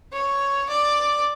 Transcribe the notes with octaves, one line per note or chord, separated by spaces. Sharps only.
C#5
D5